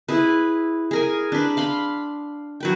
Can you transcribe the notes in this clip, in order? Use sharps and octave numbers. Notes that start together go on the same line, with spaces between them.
E4 G#4 B4
G#4 A#4 G#5
D4 B4
F5 B5 C6
F#3 B4 G5